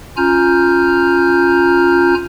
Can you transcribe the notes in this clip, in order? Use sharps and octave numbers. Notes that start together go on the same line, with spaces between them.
C#4 F4 G#5 A#5 F6 G6